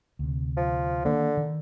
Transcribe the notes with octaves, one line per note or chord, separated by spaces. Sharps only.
D2 C3
F3
D3 D#3 A#3
D#3